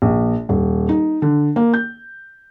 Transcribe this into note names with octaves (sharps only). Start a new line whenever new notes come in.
A#1
D#1
D#4
D3
A#3
G6